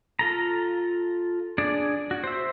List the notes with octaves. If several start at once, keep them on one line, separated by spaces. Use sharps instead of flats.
F4 A4 A#5
D4 G#4 D5
F#4
C5 E5